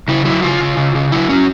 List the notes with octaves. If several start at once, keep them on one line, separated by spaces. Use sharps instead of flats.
C#3 E4
F#3 E4
C#3 F4
C#3
C#3
C#3
F#3 E4
F#3 C#4